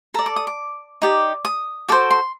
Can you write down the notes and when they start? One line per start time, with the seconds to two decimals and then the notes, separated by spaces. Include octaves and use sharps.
0.14 A4 D5 A#5
0.26 D6
0.36 D#6
0.47 D6
1.02 D#4 G4 D5
1.45 D#6
1.89 F#4 A4 C5 D6
2.11 C6